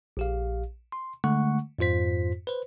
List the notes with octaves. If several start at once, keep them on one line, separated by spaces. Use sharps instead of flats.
A#1 G4 F5
C6
D3 G#3 A3 F#5 C#6
F2 G#2 F4 C5 B6
B4 C5